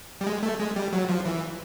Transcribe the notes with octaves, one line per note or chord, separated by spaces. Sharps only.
G3
G#3
A3
G#3
G3
F#3
F3
E3